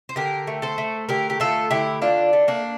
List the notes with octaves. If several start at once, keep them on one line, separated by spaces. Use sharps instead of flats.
C5
D3 G4 A#4
A3
A4 C5
A3
D3 G4 A#4
G4
A3 F4 A4
D3 E4 G4
D3 D4 F4
A3
A#3 D4